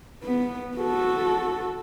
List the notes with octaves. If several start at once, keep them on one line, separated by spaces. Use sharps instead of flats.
B3
F#4 A4